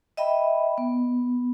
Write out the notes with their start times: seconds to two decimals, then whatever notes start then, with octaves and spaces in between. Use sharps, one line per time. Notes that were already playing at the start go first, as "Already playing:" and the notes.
0.17 D#5 E5 G5 B5
0.78 B3